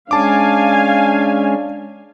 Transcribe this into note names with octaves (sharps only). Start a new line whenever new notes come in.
G#3 C#4 D4 F5 G#5 A5 D6